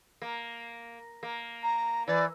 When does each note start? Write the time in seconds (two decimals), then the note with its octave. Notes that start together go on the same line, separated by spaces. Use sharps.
0.22 A#3
1.23 A#3
1.63 A#5
2.08 E3 D5